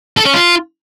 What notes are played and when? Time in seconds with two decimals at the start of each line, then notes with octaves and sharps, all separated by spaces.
0.17 A4
0.25 C#4
0.34 F4